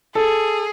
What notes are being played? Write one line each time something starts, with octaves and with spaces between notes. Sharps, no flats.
G#4 A4